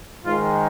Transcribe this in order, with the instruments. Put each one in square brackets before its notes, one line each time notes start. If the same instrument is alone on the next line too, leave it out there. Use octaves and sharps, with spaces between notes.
[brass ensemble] G#2 D#3 G#3 F4